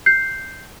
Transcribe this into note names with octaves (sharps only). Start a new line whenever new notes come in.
G6 C7